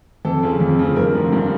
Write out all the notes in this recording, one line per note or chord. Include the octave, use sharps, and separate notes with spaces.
F2 A4
C#3 F3
F2
C#3 F3
G2 A#4
D3 F3
G2